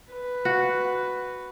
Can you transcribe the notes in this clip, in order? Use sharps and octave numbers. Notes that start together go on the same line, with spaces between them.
B4
F#4